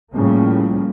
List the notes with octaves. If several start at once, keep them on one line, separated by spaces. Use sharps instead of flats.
A2 C#3 F3 G3 A#3